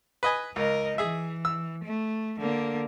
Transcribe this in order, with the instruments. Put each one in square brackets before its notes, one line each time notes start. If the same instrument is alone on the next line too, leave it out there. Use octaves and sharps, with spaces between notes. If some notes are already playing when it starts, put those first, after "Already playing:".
[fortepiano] B4 D#5 G#5
[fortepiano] C#2 [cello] A#4 D#5
[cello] E3 [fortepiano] G#4 E5
[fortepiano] E6
[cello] A3
D3 A#3